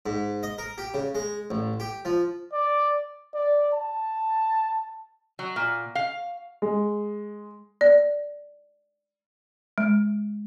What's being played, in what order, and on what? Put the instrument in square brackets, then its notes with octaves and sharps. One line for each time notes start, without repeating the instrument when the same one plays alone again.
[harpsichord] G#2
D#5
A#4
G4
C#3
G#3
A1
G4
F3
[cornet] D5
[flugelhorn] D5
A5
[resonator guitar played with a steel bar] F#3
A#2
F5
[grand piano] G#3
[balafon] D5
G#3